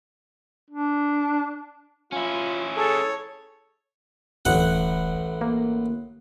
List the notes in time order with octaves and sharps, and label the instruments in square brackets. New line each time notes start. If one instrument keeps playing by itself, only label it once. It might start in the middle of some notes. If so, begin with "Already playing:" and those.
[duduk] D4
[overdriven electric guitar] C#4 E4 [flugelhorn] F4
[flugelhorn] G#4 [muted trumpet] A4 [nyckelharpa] C#5
[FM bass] D1 [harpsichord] A1 F#5
[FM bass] A#3